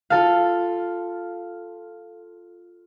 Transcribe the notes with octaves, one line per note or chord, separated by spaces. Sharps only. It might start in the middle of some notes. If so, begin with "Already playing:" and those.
F4 A4 F5